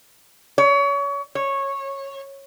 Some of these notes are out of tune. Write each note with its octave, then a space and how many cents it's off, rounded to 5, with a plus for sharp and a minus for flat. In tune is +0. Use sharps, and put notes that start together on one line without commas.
C#5 +30
C#5 -15